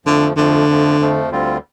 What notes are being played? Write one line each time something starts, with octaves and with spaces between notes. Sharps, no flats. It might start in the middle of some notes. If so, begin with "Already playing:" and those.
F2 D3 F3 A3
F2 D3 F3 A3
F2 F3 A3
F2 F3 A3
D2 D3 G3 C4 F4